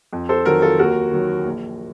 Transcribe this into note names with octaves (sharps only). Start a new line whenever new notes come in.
F2
A4 C5
D#3 F#3 F#4 A#4
F4 A4
D#2 F#4 A#4
D#3 F#3
A#1